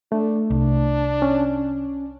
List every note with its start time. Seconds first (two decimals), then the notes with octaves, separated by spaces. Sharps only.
0.12 A3 D4
0.50 C2 D4
1.22 C#4